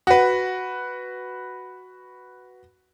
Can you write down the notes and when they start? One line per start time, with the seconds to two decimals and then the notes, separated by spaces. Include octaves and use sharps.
0.07 F#4 B4